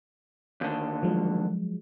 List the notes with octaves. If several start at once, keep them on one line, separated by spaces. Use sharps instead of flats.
D#2 D3
F3 F#3 G#3